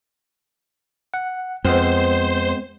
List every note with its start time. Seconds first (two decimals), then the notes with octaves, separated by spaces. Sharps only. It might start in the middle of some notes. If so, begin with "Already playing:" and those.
1.14 F#5
1.65 F2 G#3 B3 C4 C5